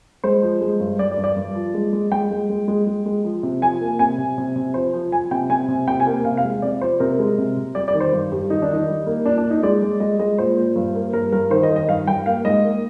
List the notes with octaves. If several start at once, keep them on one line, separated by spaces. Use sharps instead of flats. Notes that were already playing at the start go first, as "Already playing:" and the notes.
G#3 C5
F3
G#3
G2
G2 D5
D5
G2
D5
G2
F3
G#3
G#3
G#3 G5
G#3
G#3
G#3
G#3
G#3
F3
C3
F3 G#5
A#3
C3 G#5
C3
C3
C3
F3 C5
F3
F3 G#5
C3 G5
C3 G#5
C3
C3 G5
G#5
A#3
C3 F5
F5
G#3
C3 D5
F3 C5
C3 A#4
G#3
C3
C3
G3 D5
D5
D#3
C5
G2
G2 G4
D#3 D#4
D4
D#3 D#4
G3
A#3
A#2 D4
D4
A#2
D#4
G#3 D5
G#3
G#3 D#5
G#3 D#5
A#2 C5
A#2
G2
A#3
G2 A#4
G2 A#4
D#3 C5
D#5
D#3
D#5
G2 F5
G2 G5
A#3 F5
G#2 D#5
A#3